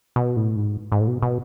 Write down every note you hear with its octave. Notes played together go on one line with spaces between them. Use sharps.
B2
A2
G#2
G#2
A2
B2
B2